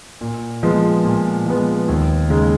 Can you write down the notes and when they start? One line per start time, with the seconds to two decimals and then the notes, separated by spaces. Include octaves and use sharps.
0.21 A#2
0.63 F3 G#3 B3
1.05 A#2
1.46 F3 G#3 B3
1.88 D#2
2.30 C#3 G#3 D#4